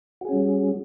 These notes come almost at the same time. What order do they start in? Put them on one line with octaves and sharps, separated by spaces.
F#4 G#4 C#4 G3